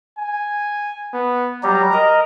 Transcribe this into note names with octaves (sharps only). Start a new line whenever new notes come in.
G#5
B3
F#3 G3 G4 A#5
A#4 D#5